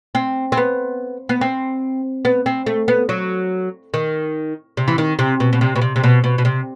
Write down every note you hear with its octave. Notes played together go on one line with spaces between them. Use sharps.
C4
C4
B3
B3
C4
B3
C4
A3
B3
F#3
D#3
C3
E3
D#3
C3
B2
B2
C3
B2
C3
C3
B2
B2
B2
C3